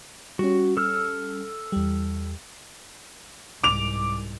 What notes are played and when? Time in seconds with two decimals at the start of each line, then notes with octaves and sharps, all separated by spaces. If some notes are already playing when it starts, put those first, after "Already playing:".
0.39 G3 C#4 F#4
0.77 A4 E6 F6
1.72 E2 G3
3.64 C2 G#2 D6 F7